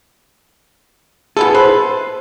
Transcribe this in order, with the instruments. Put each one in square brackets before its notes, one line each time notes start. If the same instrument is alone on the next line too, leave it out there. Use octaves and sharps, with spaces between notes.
[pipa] B3 E4 A4 [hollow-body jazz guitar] G#4
[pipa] B4 [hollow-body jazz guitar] C5